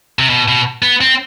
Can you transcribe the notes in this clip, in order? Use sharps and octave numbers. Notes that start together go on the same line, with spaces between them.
C3
B2
B2
B3
C4